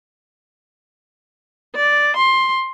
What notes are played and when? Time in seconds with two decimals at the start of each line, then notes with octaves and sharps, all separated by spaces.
1.76 D5
2.17 C6